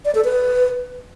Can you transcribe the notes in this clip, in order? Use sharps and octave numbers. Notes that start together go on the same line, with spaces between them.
D5
A4
B4